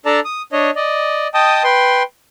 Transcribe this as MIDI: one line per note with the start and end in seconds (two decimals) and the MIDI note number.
0.06 0.20 62
0.06 0.20 69
0.06 0.20 74
0.06 0.20 81
0.06 0.20 82
0.25 0.42 87
0.52 0.71 62
0.52 0.71 73
0.52 0.71 75
0.76 1.28 74
0.76 1.28 75
1.34 1.63 75
1.34 1.63 79
1.34 1.63 81
1.34 1.63 87
1.64 2.03 71
1.64 2.03 79
1.64 2.03 84